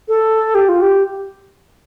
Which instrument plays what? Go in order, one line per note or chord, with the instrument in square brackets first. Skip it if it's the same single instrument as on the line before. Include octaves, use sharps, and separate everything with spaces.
[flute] A4
G4
F4
G4